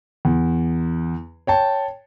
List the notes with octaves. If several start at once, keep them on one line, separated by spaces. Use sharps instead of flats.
E2
C#5 G5 A5